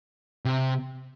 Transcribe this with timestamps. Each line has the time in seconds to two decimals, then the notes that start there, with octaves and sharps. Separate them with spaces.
0.45 C3